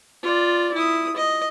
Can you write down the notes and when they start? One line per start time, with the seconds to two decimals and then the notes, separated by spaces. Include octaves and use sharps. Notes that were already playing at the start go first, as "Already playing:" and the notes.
0.23 F4 D5
0.74 E4 D#6
1.16 D#5